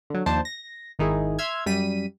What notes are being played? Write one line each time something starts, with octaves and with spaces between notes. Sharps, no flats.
D3 F#3
D#2 F3 D4 C5 A5
A#6
G#1 D#3 D#4 E4 G#4
E5 C6 E6 F6 G#6
F#2 G3 B6 D#7